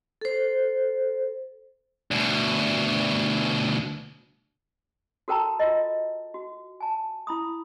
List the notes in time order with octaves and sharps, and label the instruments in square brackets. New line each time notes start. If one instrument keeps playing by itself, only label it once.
[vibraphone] A4 C5
[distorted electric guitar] D2 B2
[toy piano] F#4 A4 A#4 G5 A5 A#5
F4 F#4 A#4 D#5
F#4
G#5 A5
E4 B5 D#6